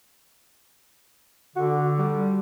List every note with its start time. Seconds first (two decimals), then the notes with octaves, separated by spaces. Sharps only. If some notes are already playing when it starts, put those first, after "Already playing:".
1.56 D3 F#4
1.98 G3